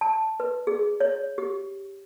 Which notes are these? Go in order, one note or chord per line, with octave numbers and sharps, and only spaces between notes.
A5
B4
G#4
C#5
G4